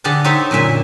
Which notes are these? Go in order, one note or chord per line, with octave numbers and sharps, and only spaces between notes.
D3 G4 G#4 F#5 A5
D#4 G4 A4 C5 C#5 E5
F#2 A#2 D3 E5 G#5